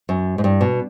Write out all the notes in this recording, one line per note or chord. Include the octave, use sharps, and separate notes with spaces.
F#2
G#2
G2
B2